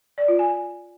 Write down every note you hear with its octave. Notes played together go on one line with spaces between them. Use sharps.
D5
F4
G#5